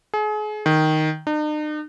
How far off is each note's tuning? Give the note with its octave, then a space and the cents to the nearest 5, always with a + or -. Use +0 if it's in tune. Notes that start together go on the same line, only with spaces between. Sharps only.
G#4 +35
D#3 +0
D#4 -45